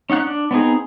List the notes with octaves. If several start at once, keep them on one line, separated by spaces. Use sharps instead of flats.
C#4 D#4 F#5 F#6
D4
B3 C4 D#4 G#4